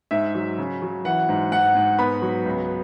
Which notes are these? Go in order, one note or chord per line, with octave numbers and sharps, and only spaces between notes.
G#2 E5
F#3
C#3
F#3
E3 F#5
G#2
G#2 F#5
G#2
B3 B5
F#3
C#2